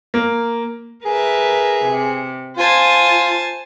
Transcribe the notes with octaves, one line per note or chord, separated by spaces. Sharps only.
A#3
G#4 A#4 B4 E5
C3
F4 C5 G#5 A5